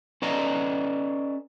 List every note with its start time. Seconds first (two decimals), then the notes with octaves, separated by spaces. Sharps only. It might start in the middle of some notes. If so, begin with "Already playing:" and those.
0.22 C#4 A4 B4 D5 D#5 A#5